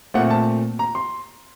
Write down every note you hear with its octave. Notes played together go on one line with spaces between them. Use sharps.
A#2 A3 C4 F#5
A5
A#5
C6